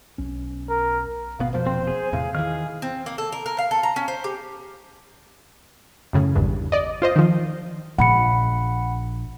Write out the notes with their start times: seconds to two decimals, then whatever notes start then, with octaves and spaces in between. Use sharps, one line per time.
0.18 B1 C#4
0.69 A#4
1.39 G#1 B2 B3 F5
1.53 F1 B2 F3 C5
1.67 C4
1.87 G#4
2.13 E2 A2 C3 F5
2.35 D#3 E3 G#4 F6
2.82 C4
3.06 A#3
3.18 A4
3.32 A#4
3.46 A#4
3.58 F5
3.71 A4
3.83 A#5
3.96 C#4
4.08 C5
4.24 G4
6.13 F#2 A2 C#3
6.36 G#1 E2 G2
6.72 D5 D#5
7.02 F4 C5 D#5
7.16 D#3 F3
7.98 A#1 F#5 B5 C#7